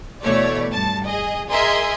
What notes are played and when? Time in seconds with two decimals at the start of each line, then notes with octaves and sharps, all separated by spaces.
0.22 B2 E3 A3 C#5 D5
0.70 G2 A5
1.07 G#4 D#5
1.50 G#4 A#4 D#5 E5 G#5 C6